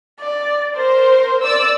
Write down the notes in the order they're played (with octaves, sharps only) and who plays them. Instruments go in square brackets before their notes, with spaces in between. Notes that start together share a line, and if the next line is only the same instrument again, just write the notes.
[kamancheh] D5
[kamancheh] A#4 [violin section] C5
[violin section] D5 E6